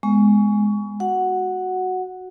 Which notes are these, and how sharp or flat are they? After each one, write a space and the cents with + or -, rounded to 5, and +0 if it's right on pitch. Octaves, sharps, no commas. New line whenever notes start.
G#3 +0 B3 +5 C#6 +25
F#4 +0 F#5 +0